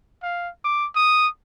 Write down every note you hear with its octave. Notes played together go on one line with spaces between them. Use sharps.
F5
D6
D#6